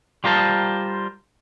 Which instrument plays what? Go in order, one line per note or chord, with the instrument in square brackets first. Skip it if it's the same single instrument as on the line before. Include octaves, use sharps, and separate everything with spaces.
[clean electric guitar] G3 F4 A#4 C5 A5